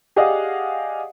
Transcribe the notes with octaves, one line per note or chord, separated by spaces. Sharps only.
G4 G#4 D5 D#5 F5 F#5